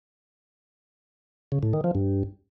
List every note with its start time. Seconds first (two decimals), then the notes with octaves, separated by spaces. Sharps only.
1.52 C#3
1.63 A2
1.73 D#3
1.84 F3
1.95 G2